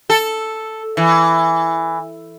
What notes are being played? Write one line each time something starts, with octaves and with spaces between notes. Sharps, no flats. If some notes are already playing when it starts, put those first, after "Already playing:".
A4
E3